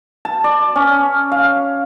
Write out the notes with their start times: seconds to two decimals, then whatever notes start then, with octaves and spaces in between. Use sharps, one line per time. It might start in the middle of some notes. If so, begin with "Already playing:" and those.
0.25 A5
0.44 D5
0.76 C#4
1.32 F5